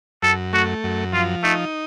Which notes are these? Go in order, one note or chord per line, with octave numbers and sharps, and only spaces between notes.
F#2 A4
A3 F#4
F#2
F3 F4
A3 D#4